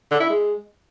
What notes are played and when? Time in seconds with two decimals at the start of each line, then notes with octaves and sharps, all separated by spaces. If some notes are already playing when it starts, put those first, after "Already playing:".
0.11 D3
0.20 E4
0.29 G#3